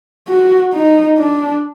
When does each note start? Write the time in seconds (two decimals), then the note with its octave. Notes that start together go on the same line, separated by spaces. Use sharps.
0.28 F#4
0.73 D#4
1.18 D4